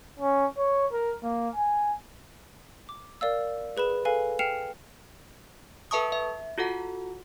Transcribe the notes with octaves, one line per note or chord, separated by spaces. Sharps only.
C#4
C#5
A#4
A#3
G#5
D6
A#4 D5 F5 E6
G#4 B4 B5 E7
A4 B4 F5 G#5
G5 F6 C7 C#7 E7 F7
A4 B4 E5 A5 C#6 D#6
E5
F4 F#4 A4 F#5